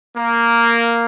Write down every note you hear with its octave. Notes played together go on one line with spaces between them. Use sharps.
A#3